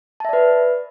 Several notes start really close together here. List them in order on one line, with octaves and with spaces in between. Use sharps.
A5 E5 D5 B4